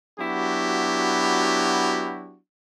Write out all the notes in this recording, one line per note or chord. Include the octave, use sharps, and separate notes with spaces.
F#3 B3 D4 E4 F#4 G4